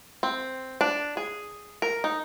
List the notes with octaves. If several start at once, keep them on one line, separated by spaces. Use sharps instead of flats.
C4
D4
G#4
A#4
D#4